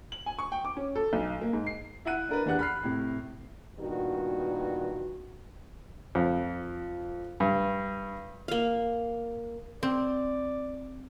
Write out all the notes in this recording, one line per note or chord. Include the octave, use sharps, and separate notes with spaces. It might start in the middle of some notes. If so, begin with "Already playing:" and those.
F#7
G#5
C#6
G5
D6
C#4
A4
B1
A#3
G#2
C7
E4 E5 F#5 F#6 D#7
D4 A#4 B4
E2 D4 G4 F#5 F#6
B5 F6 C7
A2 C3
G2 A#2 D#3 B3 F#4
F2
G2
A#3 F5
C4 D5